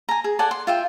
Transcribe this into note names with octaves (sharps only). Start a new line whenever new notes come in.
G#5 A#5
G#4
A4 D5 F#5 G#5
C6
F4 E5 G5